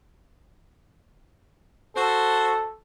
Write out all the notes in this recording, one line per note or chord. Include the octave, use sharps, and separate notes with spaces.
F#4 A4 C5